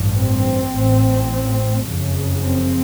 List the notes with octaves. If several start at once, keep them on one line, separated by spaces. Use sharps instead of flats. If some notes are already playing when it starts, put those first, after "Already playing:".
Already playing: A1 G2
C4
A1 A2
F#1 F2 C#3
C4